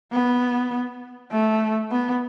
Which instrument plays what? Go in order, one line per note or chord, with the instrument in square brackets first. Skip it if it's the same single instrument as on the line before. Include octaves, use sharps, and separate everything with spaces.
[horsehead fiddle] B3
A3
B3